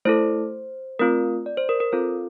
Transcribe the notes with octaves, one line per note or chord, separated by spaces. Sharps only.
A3 E4 A4 C5
A3 C4 F4 A#4
D5
C5
A#4
A#4
C4 F4 A4 C5